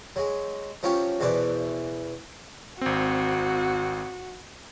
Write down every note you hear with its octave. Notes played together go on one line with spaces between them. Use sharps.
F#3 G#3
F3 F#3 C#4 F4 G4
E2 B2 E3 B4 C5 D5
G#1 C4 F#4